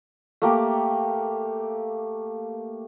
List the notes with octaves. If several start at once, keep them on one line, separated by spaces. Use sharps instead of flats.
A3 A#3 G4